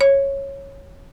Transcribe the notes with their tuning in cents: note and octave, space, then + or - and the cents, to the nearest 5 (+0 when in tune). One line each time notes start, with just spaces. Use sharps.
C#5 -10